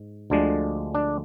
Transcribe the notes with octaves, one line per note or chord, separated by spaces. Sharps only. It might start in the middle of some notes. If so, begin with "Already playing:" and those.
Already playing: G#2
D2 D3 F3 G#3 D4
D4